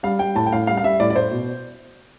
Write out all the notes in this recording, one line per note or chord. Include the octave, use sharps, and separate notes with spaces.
G3 F5
G3 G5
A2 A5
G5
A2 F5
G3 F5
F5
G3 E5
A2 D5
D5
A2 C5
B2